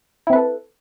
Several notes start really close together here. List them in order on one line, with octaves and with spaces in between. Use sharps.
E4 C4 B4 A4